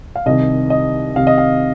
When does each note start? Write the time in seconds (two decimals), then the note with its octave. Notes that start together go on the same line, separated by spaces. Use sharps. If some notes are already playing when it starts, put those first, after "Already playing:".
0.16 F5
0.26 C2 C3 D#3 D#5
0.70 D#5
1.15 C2 C3 D#3 F5
1.27 D#5
1.38 F5